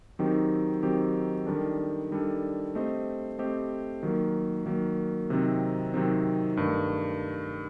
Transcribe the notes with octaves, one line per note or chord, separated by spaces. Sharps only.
D#3 F#3 C4 D#4 G4
D#3 F#3 C4 D#4 G4
D#3 G3 D4 A4
D#3 G3 D4 A4
A3 C4 G4 C5 D#5
A3 C4 G4 C5 D#5
D#3 F#3 A#3
D#3 F#3 A#3
C3 D#3 F#3 C4 D#4
C3 D#3 F#3 C4 D#4
G2 D#3 A3